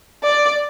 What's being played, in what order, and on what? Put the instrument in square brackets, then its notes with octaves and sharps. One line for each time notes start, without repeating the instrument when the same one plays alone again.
[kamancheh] D5